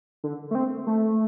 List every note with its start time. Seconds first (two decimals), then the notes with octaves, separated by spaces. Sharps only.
0.24 D3
0.51 A3
0.55 C4
0.87 A3